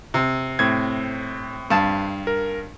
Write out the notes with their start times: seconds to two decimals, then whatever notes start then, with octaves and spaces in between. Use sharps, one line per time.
0.14 C3
0.59 A2 C4 G#6
1.70 G2 F5 A5
2.27 A#4